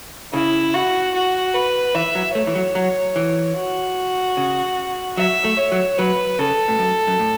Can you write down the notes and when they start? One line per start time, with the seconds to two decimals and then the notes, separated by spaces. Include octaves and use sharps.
0.33 C#3 E4
0.74 F#4
1.14 F#4
1.55 B4
1.95 E3 E5
2.15 F#3
2.35 A3 C#5
2.47 E3
2.55 F#3
2.75 F#3
3.16 E3
3.56 F#4
4.37 C#3
5.17 F#3 E5
5.45 A3
5.58 C#5
5.72 F#3
5.98 F#3 B4
6.39 C#3 A4
6.68 A2
6.79 F#2
7.07 F#2
7.19 A2